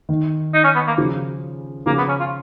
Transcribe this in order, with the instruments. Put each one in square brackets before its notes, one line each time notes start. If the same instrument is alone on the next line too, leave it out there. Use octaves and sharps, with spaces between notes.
[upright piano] D#3
[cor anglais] D#4
C#4
B3
A#3
[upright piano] C#3 F3
[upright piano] C#3 F3 [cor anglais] A#3
[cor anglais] B3
C#4
F4